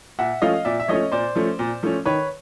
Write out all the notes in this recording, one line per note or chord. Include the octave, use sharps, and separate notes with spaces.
A#2 E5 F#5
F3 A3 C#4 D#5 F5
A#2 D5 E5
E5
F3 A3 C#4 C#5 D#5
A#2 C5 D5
F3 A3 C#4
A#2
F3 A3 C#4
D#3 B4 C#5